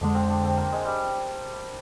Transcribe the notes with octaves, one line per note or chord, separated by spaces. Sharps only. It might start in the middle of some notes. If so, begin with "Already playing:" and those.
F2 D3 G#3 D4
C4
D4
C4
A#3
G#3
G3